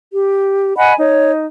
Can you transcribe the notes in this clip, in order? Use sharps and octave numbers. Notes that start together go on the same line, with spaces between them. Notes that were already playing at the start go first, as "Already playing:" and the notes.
G4
D#5 F#5 G#5 B5
D#4 C#5